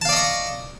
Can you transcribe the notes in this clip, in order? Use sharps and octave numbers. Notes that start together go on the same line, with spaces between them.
D5 D#5 F5 A5 C#6